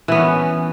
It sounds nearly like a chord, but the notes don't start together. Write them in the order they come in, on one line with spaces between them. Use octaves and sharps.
E3 B3 C#4